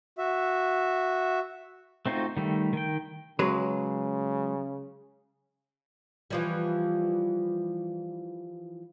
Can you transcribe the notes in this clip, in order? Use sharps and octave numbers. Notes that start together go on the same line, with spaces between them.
F#4 E5
A3 C4 D#4 F4 F#4
D#3 G3 A3
D#3 G5
C#3 F#3 G#3 B4
E3 F3 G3